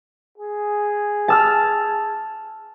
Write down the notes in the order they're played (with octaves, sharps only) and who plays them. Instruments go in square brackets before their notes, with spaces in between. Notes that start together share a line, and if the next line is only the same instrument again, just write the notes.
[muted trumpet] G#4
[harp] A5 E6 F6